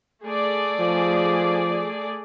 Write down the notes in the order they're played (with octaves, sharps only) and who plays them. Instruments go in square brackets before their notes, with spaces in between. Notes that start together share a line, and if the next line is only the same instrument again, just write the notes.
[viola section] A3 G#4 D5
[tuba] F3